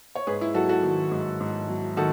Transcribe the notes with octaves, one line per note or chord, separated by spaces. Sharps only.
C#5
G#2 G#4 B4
E4
F#3 F#4 A4
F#4 A4
D#3
G#2
G#2
F#3
D#3 F#4 A4